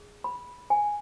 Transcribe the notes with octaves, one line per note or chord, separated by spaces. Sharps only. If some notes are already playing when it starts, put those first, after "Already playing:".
Already playing: G#4
B5
G#5